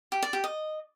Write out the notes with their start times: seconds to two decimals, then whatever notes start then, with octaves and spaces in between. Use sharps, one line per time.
0.12 G4
0.23 D5
0.33 G4
0.44 D#5